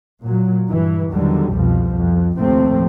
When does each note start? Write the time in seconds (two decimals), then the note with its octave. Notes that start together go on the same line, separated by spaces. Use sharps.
0.23 A#2 F#3
0.69 G2 E3
1.13 E2 D3 D#3 F#3 G3
1.53 C2 F2 B2 F3
1.95 F2
2.39 D#2 A2 C3 F3 A3 C4